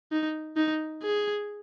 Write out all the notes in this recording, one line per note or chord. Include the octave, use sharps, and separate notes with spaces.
D#4
D#4
G#4